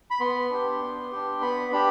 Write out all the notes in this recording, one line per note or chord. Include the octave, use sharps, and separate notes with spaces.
B5
B3 C6
D4 G4
B3
D4 G4
B3 B5
D4 G4 B5